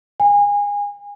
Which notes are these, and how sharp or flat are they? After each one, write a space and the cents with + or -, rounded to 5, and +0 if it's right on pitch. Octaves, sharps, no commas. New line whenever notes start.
G#5 -30